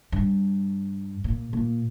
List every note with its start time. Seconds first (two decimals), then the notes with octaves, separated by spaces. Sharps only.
0.12 G2
1.24 A#2
1.53 A#2